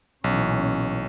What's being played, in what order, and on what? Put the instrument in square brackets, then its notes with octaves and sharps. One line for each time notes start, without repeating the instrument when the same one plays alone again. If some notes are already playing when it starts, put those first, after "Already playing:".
[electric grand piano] B1 [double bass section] A#2 E3 C#4